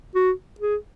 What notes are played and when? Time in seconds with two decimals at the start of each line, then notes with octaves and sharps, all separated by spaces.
0.15 F#4
0.60 G#4